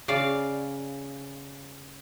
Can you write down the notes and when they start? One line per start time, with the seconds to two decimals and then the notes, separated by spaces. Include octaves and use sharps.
0.08 C#3 D5 F5